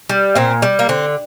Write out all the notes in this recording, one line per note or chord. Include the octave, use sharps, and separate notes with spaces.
G3
A#2 C4
G3
A#3
D3 C4